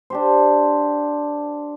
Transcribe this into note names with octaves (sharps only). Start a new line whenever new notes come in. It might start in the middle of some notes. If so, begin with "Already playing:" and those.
D4 G4 C5